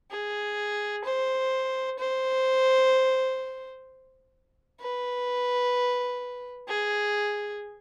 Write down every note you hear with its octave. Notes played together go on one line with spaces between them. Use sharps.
G#4
C5
C5
B4
G#4